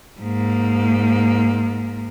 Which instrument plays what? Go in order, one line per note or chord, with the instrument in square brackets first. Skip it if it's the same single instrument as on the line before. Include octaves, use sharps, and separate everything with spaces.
[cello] G#2 A#3